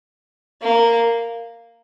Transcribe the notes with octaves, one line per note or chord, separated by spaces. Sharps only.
A#3